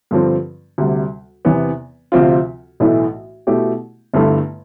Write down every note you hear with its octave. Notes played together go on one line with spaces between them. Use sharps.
G2 D3 F3 C4
D2 C3 G3
E2 C3 E3 B3
D2 C3 F3 C4 F4
B1 A2 E3 A3 E4
B2 A3 E4 G4
G1 G2 D3 A3 E4